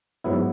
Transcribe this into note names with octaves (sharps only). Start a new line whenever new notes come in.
G#2 F#3 B3 E4